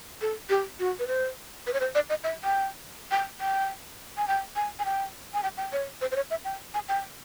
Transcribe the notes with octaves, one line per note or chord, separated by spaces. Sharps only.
A4
G4
F#4
B4
C5
B4
C#5
C5
D5
D#5
E5
G5
G5
G5
G#5
G5
G#5
G#5
G5
G#5
G5
G5
C#5
C5
C5
C#5
E5
G5
G#5
G5